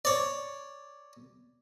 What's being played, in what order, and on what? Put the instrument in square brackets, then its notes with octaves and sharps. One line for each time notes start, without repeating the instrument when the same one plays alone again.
[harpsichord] C#5 D5